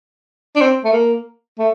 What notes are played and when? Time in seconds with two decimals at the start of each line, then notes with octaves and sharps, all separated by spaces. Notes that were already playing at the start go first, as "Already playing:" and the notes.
0.56 D4
0.61 C4
0.84 A3
0.93 A#3
1.58 A3